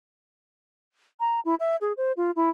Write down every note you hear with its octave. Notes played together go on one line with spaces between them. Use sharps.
A#5
E4
E5
G#4
C5
F4
E4